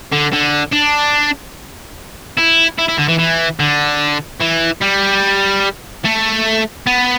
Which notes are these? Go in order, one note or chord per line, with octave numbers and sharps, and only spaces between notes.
D3
D3
D4
E4
E4
E4
D3
E3
E3
D3
E3
G3
A3
B3